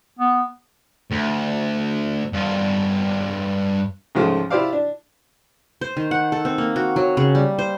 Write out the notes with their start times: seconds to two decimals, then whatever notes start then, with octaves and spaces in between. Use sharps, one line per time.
0.19 B3
1.12 D2
2.33 G2 F4
4.15 C#2 G#2 F3 G#3 A3
4.50 E4 F4 G4 C5 D5 F5
4.73 D4
5.81 C5
5.97 D#3
6.11 F#5
6.32 A4
6.45 C4
6.58 A#3
6.76 F#4
6.96 F#3
7.17 C#3
7.35 G3
7.59 C5